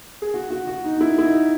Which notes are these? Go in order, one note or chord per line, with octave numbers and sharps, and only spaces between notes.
G#4
F#4
F#4
F#4
D#4
D#4
E4
E4
D#4